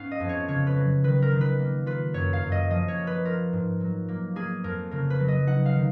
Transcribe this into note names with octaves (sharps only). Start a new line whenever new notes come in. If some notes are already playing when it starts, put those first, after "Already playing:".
Already playing: G#2 B3 C#4 F5
D#5
F2
C#5
C#3 C#5
B4
F#3
D#3 B4
A#4
D#3
B4
A#3
F4 B4
F#2 C#5
F5
F#2
D#5
F3 D#5
C#5
A#3
B4
F4 A#4
G#2
F#3
A#3
A#3 G#4
F2 A#4
C#3 A#4
B4
F#3
D#5
D#4 F#5
F5
D#3